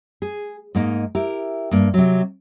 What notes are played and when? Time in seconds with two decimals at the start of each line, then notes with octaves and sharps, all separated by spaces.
0.22 G#4
0.75 G#2 A#3 D#4
1.15 E4 G4 A#4
1.71 G2 A#3
1.94 C3 F#3